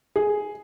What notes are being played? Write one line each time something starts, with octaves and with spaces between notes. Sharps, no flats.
G#4